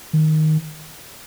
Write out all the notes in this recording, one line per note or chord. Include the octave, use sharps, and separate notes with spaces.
D#3